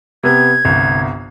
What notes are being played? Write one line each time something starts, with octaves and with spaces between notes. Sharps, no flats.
C3 B3 G#6
G1 C2